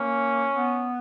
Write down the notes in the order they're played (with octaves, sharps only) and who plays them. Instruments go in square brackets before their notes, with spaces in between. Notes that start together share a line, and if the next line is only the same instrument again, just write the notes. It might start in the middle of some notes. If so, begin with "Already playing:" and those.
Already playing: [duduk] A#3 [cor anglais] C#4
[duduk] B3